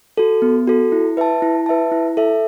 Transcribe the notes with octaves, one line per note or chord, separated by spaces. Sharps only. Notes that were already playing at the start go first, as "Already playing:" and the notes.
F#4 A4
B3
F#4 A4
E4
B4 E5 A5
E4
B4 E5 A5
E4
A4 E5